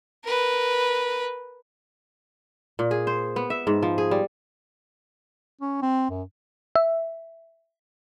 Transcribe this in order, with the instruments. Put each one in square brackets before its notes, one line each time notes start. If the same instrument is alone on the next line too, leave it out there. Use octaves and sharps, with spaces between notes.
[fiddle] A#4 B4
[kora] A#2
G#4
C5
B3
E5
G#2
F3
G#4
G3
[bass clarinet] C#4
C4
F#2
[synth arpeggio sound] E5